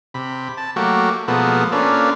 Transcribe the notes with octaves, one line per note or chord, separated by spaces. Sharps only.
C3 B5
A5
F#3 A3 A#3 F#4 G4
B2 F3 G#3 A#3 B3 A4
A#3 C#4 D4 F4 A4 B4